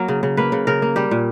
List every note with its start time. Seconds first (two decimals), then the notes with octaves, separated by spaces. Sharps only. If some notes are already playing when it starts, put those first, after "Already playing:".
Already playing: F#3 A#3 A#4
0.08 C#3
0.23 C#3
0.37 A#3 B4
0.52 C#3
0.67 C#3 A#4
0.82 A#3
0.96 G3 G4
1.11 A#2